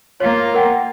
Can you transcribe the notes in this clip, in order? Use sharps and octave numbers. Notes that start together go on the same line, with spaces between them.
A#3 F4 C#5
A#4 F#5 G5